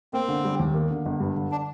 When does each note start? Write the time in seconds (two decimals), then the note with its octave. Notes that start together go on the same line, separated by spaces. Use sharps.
0.13 A#3 C4
0.28 D3
0.45 G3
0.59 D#2
0.74 A#3
0.91 D3
1.06 G1
1.20 G2
1.36 D3
1.52 D4